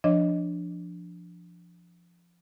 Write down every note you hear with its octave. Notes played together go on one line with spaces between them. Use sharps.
F3 D4 C#5 D#5